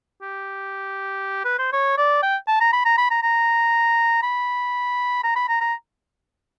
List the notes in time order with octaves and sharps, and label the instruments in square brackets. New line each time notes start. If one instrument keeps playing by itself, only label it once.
[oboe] G4
B4
C5
C#5
D5
G5
A5
A#5
B5
A#5
B5
A#5
A#5
B5
A#5
B5
A#5
A#5